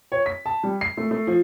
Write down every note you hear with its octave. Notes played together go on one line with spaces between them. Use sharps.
C#5
B6
A5
G3
C7
A3
A3
F3